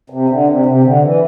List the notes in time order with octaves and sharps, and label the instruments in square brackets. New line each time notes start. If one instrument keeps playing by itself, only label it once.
[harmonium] C3
D3
C3
C3
D3
E3